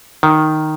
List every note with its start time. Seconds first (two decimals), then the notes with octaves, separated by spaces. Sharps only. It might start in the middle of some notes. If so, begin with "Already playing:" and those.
0.23 D#3